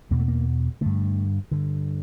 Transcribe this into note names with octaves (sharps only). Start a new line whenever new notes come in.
E2 B2 A#3
A3
A#3
G2 D3 A3
G2 D3